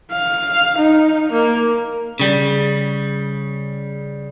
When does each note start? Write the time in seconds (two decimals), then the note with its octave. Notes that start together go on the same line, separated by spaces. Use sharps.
0.12 F5
0.78 D#4
1.32 A#3
2.20 C#3 G3